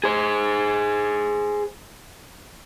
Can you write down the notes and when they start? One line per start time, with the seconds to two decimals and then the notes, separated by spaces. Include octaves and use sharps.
0.04 G#4 C5